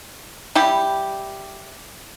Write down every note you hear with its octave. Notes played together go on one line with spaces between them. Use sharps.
G3 E4 G4